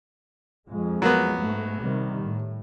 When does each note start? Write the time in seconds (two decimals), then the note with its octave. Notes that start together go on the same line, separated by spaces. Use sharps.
0.68 F2 G#3
1.02 F#3 A#3 B3
1.38 G#2 A3
1.80 C3 D#3 G3
2.23 A2